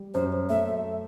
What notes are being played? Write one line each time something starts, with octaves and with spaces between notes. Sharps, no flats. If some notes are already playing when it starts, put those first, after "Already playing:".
Already playing: G3
F#2 C5
A3 E5